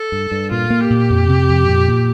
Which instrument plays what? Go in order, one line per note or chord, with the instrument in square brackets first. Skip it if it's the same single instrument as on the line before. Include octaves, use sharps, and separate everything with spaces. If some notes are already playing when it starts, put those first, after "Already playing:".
Already playing: [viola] A4
[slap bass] G2
G2
[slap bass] A#2 [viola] F4
[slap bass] A#3
[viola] G4
[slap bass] A#2
F2
C3
F2
A#2
A#2